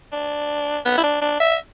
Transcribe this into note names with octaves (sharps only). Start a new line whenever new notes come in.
D4
B3
E4
D4
D4
E5